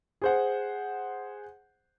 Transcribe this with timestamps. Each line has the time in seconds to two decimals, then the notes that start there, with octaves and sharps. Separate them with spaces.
0.22 G#4 C5 F#5